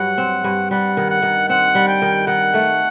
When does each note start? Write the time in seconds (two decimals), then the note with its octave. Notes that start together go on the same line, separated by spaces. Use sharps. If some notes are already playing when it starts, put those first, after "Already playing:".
Already playing: G2 F#3 F#5
0.18 C4
0.44 G2
0.70 G3 F#5
0.97 D#3
1.10 F#5
1.22 D#3
1.49 C4 F#5
1.75 G3
1.88 G5
2.02 D#3
2.27 D#3 F#5
2.54 A3